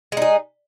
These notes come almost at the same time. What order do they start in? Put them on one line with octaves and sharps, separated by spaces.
G#3 D#4 G#4